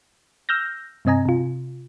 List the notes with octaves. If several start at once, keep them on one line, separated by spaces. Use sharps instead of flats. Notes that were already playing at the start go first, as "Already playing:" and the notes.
E6 F6 G6 A#6
G2 C3 C4 D#5 G#5 A#5
C3 F4